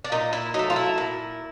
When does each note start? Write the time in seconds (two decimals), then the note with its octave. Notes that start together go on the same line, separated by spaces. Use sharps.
0.04 D4
0.12 A#2 D#4
0.33 E4
0.54 F#3 A3 D#4
0.70 F4
0.76 E4
0.98 A#2